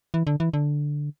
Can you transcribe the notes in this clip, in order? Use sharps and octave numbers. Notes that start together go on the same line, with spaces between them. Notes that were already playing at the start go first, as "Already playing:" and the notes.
E3
D3
E3
D3